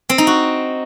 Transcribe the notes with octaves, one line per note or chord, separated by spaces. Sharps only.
C4
D#4
F#4